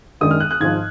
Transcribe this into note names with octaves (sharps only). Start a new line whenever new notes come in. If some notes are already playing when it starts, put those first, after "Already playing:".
F#2 D#3 G#3 D4 D#6
F6
F#6
F#6
G#1 G#2 F3 G#6